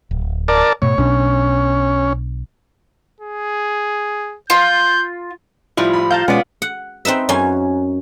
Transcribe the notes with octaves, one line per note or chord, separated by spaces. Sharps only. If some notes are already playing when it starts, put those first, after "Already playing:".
D1
A#4 D5 A5
G#2 B2 A3 C#5
B1 B2 C#4 D4
G#4
F4 G6
A2 F3 G3 E4 F4
B5
F5 A5 A#5 G6
B2 G#3 B3 C#4 D5
F#5
C4 D#4 B4 E5
F#2 C#4 G#5 C6